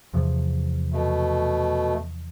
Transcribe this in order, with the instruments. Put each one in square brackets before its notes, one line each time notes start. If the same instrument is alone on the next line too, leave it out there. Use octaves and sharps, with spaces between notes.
[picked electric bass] E2 C3 F3
[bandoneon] B2 A3